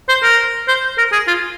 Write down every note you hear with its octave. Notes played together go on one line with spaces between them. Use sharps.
C5
A#4
C5
A#4
G#4
F4